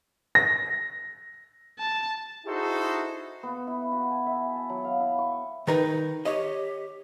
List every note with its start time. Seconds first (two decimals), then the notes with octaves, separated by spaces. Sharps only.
0.35 A#6
1.79 A5
2.46 D#4 E4 F#4 G#4 A4 C5
3.43 B3
3.67 E4
3.92 F#4
4.11 G#5
4.26 E5
4.56 A5
4.70 F#3
4.84 F5
5.00 E4
5.18 C#6
5.67 D#3 D#4 A#4 B4
6.25 G4 C#5 D#5